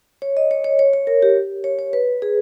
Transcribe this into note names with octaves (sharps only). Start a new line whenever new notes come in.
C#5
D#5
C#5
C#5
C#5
C#5
A#4
G4
C#5
C#5
B4
G#4